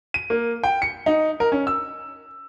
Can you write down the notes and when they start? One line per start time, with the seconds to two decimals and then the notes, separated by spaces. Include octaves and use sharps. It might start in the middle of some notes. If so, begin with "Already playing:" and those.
0.14 D#7
0.30 A#3
0.63 G5
0.82 C#7
1.06 D#4
1.40 A#4
1.52 C#4
1.67 E6